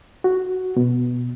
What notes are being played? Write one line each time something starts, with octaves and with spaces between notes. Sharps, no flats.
F#4
B2